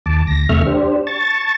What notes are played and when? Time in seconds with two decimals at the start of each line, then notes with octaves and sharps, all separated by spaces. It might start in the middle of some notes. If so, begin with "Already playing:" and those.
0.06 D#2 A5 D6
0.27 D2 A#6
0.49 E2 C3 A3 E5 C#6 F6
0.66 D4 G4 C5
1.07 A5 C#6 A6